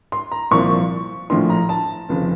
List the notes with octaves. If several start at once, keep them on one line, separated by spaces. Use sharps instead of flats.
C6
A#5
C2 A#2 F3 C#6
A#1 A2 F3 C6
A#5
A5
F1 F2 C#3 F3